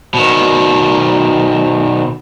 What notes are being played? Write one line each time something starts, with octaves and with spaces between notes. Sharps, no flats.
B2 D#3